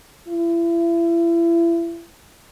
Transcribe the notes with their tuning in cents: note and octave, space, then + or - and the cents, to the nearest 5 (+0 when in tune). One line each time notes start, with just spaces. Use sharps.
E4 +35